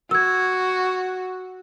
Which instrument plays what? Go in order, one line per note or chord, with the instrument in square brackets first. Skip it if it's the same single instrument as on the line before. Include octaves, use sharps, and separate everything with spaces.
[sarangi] F#4 [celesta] E6 G#6